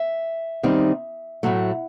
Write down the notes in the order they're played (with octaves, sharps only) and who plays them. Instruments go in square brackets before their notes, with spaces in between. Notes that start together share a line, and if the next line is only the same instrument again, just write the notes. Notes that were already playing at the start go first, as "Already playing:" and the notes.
Already playing: [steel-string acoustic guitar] E5
D#3 G3 C4 D#4
A2 F#3 A3